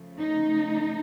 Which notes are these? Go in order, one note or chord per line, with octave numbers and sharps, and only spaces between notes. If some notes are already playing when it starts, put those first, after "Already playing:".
Already playing: C#3 F3 A3
D#4